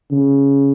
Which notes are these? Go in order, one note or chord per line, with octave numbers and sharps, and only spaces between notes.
C#3